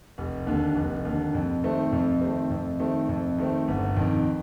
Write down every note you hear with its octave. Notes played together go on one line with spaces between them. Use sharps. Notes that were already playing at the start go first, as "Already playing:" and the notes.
F1
D#2 D3
F1
D#2 D3
F2
D#3 A3 C4
F2
D#3 A3 C4
F2
D#3 A3 C4
F2
D#3 A3 C4
G1
F2 D#3